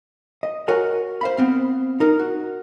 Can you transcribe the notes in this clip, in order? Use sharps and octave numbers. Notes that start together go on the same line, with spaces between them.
D#5
F#4 A#4 C#5 G#5
C5 F5 B5
B3 C4 F5
D#4 A#4
F#4